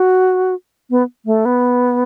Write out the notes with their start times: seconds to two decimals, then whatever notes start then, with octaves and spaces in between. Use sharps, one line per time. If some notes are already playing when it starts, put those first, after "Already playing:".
Already playing: F#4
0.90 B3
1.25 A3
1.45 B3